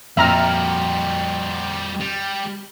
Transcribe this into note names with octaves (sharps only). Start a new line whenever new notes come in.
F2 A#2 G3 F#4 E5 A#5 F6
G3